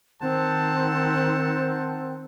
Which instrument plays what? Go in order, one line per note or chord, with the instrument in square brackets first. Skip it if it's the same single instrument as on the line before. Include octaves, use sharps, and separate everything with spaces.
[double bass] D#3 [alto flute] C4 [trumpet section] C5 F#5 A5